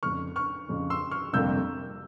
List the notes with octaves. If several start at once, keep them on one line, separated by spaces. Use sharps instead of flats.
F1 F2 C#3 C#6 F6
C#6 F6
F1 F2 C#3
C6 E6
C#6 F6
G1 F2 C3 G3 A#3 E6 G6